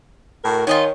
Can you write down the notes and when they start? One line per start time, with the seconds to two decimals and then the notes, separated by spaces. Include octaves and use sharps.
0.44 A2 F#4 A#4
0.67 D#3 F4 C#5 D#5 G#5